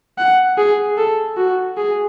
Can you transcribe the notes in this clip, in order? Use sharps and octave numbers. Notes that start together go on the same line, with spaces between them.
F#5
G#4
A4
F#4
G#4